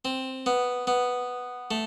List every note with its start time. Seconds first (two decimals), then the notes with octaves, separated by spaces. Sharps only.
0.05 C4
0.46 B3
0.87 B3
1.71 A3